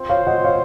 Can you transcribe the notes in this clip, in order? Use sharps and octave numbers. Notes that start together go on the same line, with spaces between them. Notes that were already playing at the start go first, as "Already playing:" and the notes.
Already playing: C4 F4 C5
C#5 F5
D#5 F#5
C#5 F5